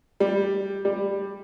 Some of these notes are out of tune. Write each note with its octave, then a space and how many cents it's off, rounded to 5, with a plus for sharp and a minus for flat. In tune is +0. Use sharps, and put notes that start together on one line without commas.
G3 +5
G3 +10